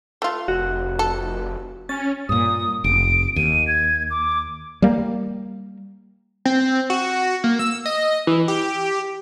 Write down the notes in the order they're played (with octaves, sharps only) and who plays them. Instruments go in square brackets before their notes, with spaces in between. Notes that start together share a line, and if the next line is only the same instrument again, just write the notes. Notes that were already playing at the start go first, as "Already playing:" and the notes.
[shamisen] A3 F4
[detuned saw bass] F1 [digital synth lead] F#4
[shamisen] A4
[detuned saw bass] C#4 [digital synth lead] A6
[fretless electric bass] G2 A#2 [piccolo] D#6
[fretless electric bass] F1 [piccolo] D7
[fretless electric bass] D#2 [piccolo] D#7
[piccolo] G#6
D6
[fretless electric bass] G3 A#3
[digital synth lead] C4
F#4
A#3
E6
D#5
E3
G4